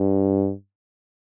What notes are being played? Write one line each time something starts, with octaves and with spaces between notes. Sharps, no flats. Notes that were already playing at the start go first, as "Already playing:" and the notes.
Already playing: G2